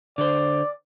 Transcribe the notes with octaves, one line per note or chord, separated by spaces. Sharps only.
D3 C5 D5